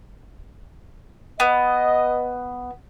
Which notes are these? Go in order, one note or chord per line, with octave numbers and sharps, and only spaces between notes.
B3 D#5